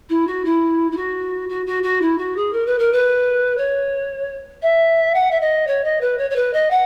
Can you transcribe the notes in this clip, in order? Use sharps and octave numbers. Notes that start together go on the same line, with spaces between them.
E4
F#4
E4
E4
F#4
F#4
F#4
F#4
E4
F#4
G#4
A#4
B4
A#4
B4
C#5
E5
F#5
E5
D#5
C#5
D#5
B4
C#5
C#5
B4
D#5
F#5